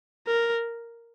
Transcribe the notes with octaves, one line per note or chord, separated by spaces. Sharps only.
A#4